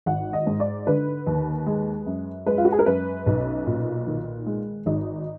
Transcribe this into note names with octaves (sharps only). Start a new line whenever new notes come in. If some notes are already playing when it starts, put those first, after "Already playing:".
G#1 F#5
D#5
G#2
D5
D3 B4
D#2
G#3
F#2
G#3 B4
F4
F#4
G#4
A#4
F#2 B4
B1
A#2
D#3
G#3
G#1 D#4